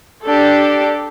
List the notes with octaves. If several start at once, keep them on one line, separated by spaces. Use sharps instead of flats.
D4 G4 A4